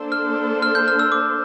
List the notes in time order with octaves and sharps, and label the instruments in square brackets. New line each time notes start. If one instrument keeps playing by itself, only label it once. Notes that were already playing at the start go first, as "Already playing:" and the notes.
Already playing: [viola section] A#3 D4 A4 C5
[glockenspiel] F6
F6
G6
F6
E6
D6